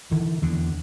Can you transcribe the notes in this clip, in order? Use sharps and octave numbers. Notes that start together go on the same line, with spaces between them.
D3 E3
E2 D3